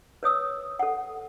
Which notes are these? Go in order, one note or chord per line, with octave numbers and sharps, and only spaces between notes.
B4 C#5 D#6 E6
A4 F#5